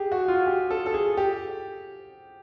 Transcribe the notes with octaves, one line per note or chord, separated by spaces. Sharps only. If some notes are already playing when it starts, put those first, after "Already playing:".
Already playing: G4 G#4
F#4
F4
G4
A4
A4
G#4
G4